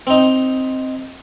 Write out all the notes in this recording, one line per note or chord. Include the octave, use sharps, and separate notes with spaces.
C4 D#4